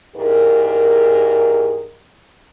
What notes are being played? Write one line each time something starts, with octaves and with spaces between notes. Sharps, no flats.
E2 G#2 G4 G#4 A#4